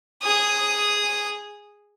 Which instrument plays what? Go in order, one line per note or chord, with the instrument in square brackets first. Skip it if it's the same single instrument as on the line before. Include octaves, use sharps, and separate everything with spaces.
[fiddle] G#4 D#6